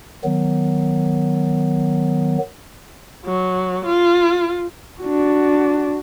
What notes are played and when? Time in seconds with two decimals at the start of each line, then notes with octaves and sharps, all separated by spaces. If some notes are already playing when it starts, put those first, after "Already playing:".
0.24 D#3 F#3 B3
3.25 F#3
3.86 F4
5.01 D4 F#4